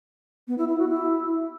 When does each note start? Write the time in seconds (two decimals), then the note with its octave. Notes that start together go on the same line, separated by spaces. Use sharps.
0.48 B3
0.58 E4
0.68 E4
0.79 F#4
0.89 E4